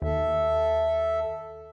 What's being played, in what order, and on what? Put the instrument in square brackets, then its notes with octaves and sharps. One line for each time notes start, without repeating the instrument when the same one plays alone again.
[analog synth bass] D#2 [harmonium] A4 E5